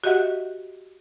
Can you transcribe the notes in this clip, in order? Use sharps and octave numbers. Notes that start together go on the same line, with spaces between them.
F#4 G4 D#5 E5 F#5 F#6